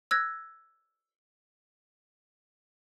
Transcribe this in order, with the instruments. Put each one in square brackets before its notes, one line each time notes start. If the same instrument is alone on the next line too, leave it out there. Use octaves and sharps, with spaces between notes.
[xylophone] E6 F#6 G#6 A#6